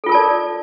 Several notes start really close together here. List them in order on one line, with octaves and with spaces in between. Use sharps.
A4 F4 A#4 A5 D5